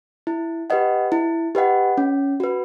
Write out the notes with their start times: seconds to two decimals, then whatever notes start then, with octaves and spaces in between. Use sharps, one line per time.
0.27 E4
0.70 G4 B4 D#5 F#5
1.12 E4
1.55 G4 B4 D#5 F#5
1.98 C#4
2.40 F#4 B4